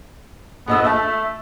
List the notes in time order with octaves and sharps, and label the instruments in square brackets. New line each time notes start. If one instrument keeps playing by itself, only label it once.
[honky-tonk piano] A#1 D#5 E6 [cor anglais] B3
[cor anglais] A3 [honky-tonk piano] E5 A5